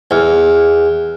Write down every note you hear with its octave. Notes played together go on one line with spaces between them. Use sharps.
E2